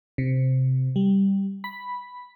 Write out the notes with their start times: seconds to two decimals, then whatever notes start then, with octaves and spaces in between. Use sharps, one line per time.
0.18 C3
0.96 G3
1.64 B5